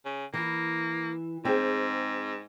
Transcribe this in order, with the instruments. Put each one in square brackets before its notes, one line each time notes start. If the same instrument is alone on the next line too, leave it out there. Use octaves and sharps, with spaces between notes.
[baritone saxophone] C#3
[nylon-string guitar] E3 [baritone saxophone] A#3
[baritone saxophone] G#2 [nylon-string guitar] C4 G#4